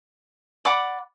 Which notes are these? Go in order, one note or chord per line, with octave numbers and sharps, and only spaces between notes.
D5 F#5 B5 D6